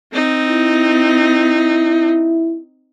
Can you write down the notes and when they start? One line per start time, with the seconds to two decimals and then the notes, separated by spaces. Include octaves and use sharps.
0.14 C4 D#4
0.48 E4